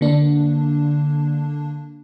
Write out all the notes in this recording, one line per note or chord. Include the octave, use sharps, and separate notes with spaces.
D3 A#3 D4